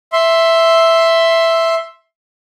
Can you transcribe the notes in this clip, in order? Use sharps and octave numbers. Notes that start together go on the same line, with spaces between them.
E5 C6